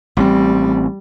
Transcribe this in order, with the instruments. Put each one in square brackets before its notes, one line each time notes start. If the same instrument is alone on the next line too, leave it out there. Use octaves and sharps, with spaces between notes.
[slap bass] A1 C4 [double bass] G3